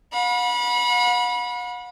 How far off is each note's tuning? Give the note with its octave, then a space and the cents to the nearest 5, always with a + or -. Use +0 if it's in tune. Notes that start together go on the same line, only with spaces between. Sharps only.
F#5 -45 B5 -25